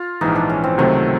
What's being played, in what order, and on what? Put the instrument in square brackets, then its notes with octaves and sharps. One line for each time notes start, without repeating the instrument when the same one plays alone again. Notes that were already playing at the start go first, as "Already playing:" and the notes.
Already playing: [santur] F4
[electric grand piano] A#1 G#2 E3 [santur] D#4
[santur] D4
C#4
C4
[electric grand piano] C#2 C3 D#3 F#3 A3 [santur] C4